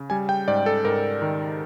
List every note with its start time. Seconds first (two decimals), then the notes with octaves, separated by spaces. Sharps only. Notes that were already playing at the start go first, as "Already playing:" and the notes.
Already playing: C#3
0.10 G3 G#5
0.29 G5
0.48 G#2 D5
0.66 A4
0.85 G#2 A#4
1.22 D#3